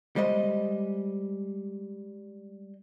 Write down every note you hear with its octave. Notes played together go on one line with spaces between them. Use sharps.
G3 G#3 C5 D#5